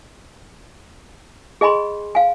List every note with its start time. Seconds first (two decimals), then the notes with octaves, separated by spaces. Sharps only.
1.61 G#4 D#5 G#5 B5 C6
2.15 F5 G#5